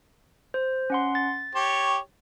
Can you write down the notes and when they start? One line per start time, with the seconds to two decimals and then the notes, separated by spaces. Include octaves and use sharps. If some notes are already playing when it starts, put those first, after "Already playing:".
0.54 C5
0.90 C#4 F#5 C6
1.15 A6
1.55 G4 C#5